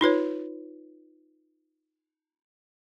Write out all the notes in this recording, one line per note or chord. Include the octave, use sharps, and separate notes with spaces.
D#4 F4 B4 C#5